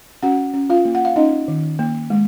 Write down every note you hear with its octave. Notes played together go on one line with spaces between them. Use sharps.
C#4 F#4 F#5
C#4
F4 F5
A#3
F#5
F5
C#4 D#4 D#5
D#3
A#3
G#3